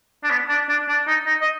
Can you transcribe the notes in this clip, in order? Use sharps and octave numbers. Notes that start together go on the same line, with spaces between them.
D4
B3
D4
D4
D4
D#4
D#4
D#5